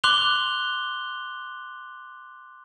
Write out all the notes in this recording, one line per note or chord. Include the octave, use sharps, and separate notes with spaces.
C6 D6 F#6 F7 G7